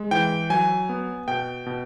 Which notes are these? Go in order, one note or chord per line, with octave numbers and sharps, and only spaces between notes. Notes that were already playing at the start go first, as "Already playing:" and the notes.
Already playing: G#3
E3 G5
F#3 G#5
B3
B2 G5
B2